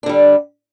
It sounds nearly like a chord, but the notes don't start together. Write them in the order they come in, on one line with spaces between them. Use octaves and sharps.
D4 D3 G3